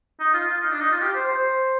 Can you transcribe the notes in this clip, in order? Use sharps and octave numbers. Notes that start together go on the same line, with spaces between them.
D#4
F4
F4
D#4
D4
D#4
F4
G4
C5
C5